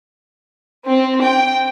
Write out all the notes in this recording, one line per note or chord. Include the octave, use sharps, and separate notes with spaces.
C4
G5